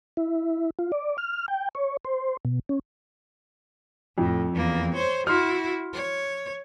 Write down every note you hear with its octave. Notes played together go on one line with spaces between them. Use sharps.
E4
F4
D5
F6
G5
C#5
C5
B2
C#4
F2 A2
E2 A#3
C5 C#5
E4 F#4 C6 F6
C#5